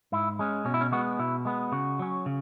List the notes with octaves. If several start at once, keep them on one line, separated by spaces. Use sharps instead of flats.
G#2 E4
G#3 C#4
B2 C#4
E4
C#4
G#3 B3 F#4
B2 E4
G#3 B3
C#3 F#4
F#3 C#4
C#3